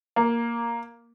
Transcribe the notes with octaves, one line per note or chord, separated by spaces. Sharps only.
A#3